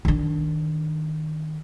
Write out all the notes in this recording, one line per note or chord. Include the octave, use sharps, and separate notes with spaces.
D#3 D4